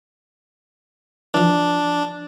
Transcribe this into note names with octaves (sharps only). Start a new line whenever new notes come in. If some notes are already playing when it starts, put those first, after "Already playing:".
E3 F3 D4